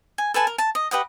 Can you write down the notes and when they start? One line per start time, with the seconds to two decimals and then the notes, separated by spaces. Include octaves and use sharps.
0.18 G#5
0.34 A4 B4 G#5 A5
0.47 A#4
0.58 A5
0.75 D#5
0.91 G4 B4 D#5 F#5